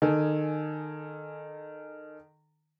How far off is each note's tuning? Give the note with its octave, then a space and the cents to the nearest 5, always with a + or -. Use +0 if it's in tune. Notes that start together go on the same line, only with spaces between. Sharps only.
D#3 -25 A4 -15 G#5 +0